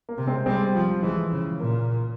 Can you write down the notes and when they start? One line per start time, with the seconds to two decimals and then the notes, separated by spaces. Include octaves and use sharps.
0.09 A#3
0.18 C3
0.27 G#3 C4
0.46 G3 G#3 C4
0.75 F3
1.03 E3 G#3
1.32 C#3
1.60 A#2 A#3